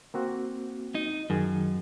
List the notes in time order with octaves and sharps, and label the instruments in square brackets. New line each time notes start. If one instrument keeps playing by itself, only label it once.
[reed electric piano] A#3 C4 F#4
[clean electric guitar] D#4
[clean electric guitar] F#2 [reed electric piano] D#3 G#4